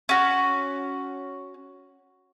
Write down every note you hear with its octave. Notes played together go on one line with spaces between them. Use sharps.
C#4 F#4